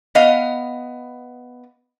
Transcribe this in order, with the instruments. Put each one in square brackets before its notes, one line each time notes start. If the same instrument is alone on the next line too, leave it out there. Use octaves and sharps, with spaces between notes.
[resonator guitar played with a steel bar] B3 D#5 F5